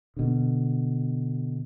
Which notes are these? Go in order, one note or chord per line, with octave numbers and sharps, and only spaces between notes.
B2 D3